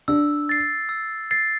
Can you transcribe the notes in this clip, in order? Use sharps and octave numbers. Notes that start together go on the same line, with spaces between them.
D4 E6
A6 C7
E6
A6 C7